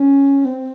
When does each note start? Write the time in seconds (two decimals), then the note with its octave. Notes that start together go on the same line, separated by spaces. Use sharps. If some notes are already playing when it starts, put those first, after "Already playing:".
Already playing: C#4
0.45 C4